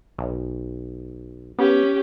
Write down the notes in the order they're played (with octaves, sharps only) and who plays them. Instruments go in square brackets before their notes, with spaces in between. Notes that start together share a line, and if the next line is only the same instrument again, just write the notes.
[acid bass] B1
[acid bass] B3 [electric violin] C#4 G4